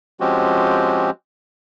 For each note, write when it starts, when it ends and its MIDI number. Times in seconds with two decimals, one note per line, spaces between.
0.20 1.10 53
0.20 1.10 56
0.20 1.10 60
0.20 1.10 61
0.20 1.10 66
0.20 1.10 67